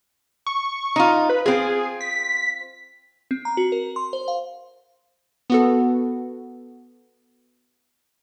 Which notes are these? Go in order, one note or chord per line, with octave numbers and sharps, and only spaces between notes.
C#6
D#4 F4
B4
C4 F4 G#4
B6
C4
A#5
F#4
A#4
C6
C5
F5
B3 F#4 A4